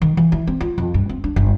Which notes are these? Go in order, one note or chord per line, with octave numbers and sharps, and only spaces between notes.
D#3
E3
E4
C4
F4
F2
G2
C4
D4
G1